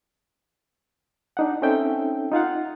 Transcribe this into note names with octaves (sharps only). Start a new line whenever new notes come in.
D4 D#4 F#5
C4 C#4 D#4 A4 E5 G5
D#4 F4 F5 F#5